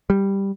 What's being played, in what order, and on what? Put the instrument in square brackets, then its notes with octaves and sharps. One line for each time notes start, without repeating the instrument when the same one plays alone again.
[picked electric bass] G3